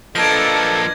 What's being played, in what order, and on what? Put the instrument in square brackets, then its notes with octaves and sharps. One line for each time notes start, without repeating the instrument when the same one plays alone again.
[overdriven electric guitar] F3 A#3 [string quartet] D4 B4 D#5 [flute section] A4 [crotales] G#6 A#6